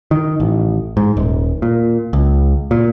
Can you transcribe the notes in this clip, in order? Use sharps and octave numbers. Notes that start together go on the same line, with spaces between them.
D#3
A1
G#2
D#1
A#2
C#2
A#2